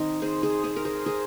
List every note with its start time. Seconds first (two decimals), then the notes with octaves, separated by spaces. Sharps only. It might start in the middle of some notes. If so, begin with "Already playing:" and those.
Already playing: D#3 C4 D#4
0.22 G#4 C5
0.43 G#4 C5
0.64 G#4 C5
0.76 A#4
0.85 G#4 C5
1.06 G#4 C5